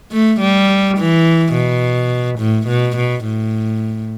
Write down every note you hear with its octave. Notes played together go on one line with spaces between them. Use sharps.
A3
G3
E3
B2
A2
B2
B2
A2